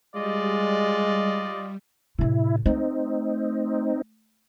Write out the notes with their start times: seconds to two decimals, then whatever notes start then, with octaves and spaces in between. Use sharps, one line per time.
0.15 G3 G#3 F4 D5 D#5
2.19 A2 C3 E4
2.66 A3 C4 D#4